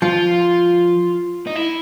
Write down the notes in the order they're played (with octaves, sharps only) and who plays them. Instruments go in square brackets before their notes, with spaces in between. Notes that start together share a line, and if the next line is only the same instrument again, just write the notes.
[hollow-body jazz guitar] F3 [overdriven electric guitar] F4
[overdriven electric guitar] D#4
E4